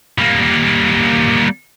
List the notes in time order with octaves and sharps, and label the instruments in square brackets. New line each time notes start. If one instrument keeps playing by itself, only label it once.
[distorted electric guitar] G3 A#3